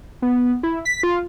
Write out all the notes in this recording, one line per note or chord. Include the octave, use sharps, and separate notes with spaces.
B3
E4
B6
F4